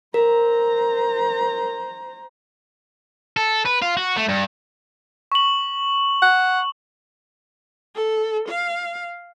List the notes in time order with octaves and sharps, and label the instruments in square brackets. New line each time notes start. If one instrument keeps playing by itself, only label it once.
[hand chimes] A#4 [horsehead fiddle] C5 A#5
[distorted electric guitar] A4
B4
F4
F#4
A3
G2
[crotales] C#6 F#7
[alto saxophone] F#5
[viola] A4
F5